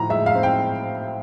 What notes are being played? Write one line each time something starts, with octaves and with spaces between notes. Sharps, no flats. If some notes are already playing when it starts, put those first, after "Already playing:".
Already playing: A2 F3 A#5
G#3 E5
F5
C4
G5